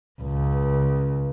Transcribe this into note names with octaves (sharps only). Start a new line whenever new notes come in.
C#2